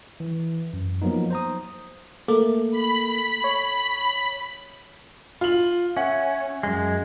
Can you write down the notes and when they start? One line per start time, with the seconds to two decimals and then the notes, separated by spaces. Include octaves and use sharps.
0.20 E3
0.73 F#2
1.02 F3 F#3 A#3 B3 D#4
1.31 C5 A#5 D#6
2.28 A3 A#3 A4
2.71 B5
3.44 C#5
5.41 F4 F#7
5.97 C#4 E5 F#5
6.63 F#2 G#3